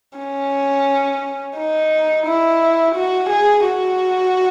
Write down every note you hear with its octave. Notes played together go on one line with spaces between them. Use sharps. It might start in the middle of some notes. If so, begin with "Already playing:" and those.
C#4
D#4
E4
F#4
G#4
F#4